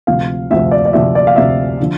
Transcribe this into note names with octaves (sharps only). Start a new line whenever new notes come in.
D2 C3 F3 F5
D2 C3 F3 E5
D5
D5
D2 C3 F3 E5
D5
F5
D2 C3 F3 E5
D3 F3